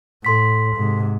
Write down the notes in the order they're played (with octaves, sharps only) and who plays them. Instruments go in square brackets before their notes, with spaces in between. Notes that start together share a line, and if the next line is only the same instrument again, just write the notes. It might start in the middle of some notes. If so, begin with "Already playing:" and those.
[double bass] A2 [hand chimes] A4 C6 B6
[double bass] G#2 C3